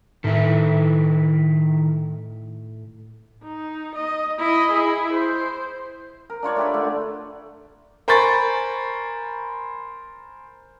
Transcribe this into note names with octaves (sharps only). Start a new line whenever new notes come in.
A2 D#3 E4
D#4
D#5
E4 D#5
E4 G#4
C5
A#4
D4 F4 C#5 D5
A3 G4 B4
D3 A3
A#4 C5 G#5 B5 C#6 A6